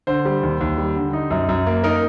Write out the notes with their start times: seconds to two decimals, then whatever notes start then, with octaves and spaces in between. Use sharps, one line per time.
0.07 D3 C5
0.25 G3
0.43 D#2
0.61 D#2
0.78 G3
0.96 D3
1.13 D#4
1.30 F#2
1.49 F#2
1.67 A#3
1.84 D#4 A#4